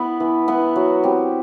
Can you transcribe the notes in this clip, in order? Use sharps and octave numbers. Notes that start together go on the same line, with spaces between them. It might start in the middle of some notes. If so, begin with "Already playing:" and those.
Already playing: B3 E4 B4
E3
B3 E4 B4
F#3
C4 G4